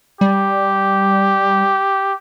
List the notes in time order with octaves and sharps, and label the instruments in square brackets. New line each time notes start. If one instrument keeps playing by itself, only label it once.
[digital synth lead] G3 [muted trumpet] G4